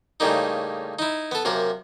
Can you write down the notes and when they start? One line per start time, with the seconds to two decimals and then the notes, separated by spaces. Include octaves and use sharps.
0.20 A2 C#3 G3 A#3 D#4
0.99 D#4 E4
1.31 B3 A4
1.45 F#2 C3 A#3 A#4